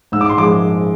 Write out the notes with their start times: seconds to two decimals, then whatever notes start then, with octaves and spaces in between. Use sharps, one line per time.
0.12 G#2 E6
0.21 D6
0.29 C6
0.37 F3 G#3 D6